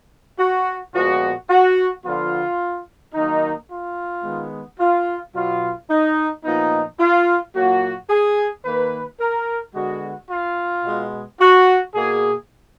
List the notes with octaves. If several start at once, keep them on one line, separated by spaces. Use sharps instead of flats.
F#4
A#2 F3 G#3 B3 F#4
F#4
D3 F3 B3 F4
D#3 F#3 A#3 D#4
F4
D#3 G#3 B3
F4
B2 F#3 B3 F4
D#4
A#2 F3 B3 D#4
F4
A#2 F#3 A#3 F#4
G#4
D#3 A#3 B4
A#4
D3 G#3 B3 F#4
F4
B2 G#3 B3
F#4
B2 A#3 G#4